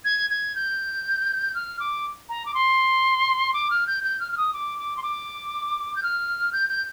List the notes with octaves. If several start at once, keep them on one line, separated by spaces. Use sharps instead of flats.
G#6
G#6
G6
F6
D6
A#5
D6
C6
D6
F6
G6
G6
F6
F6
D#6
D6
D6
C6
D6
G6
F6
G6
G6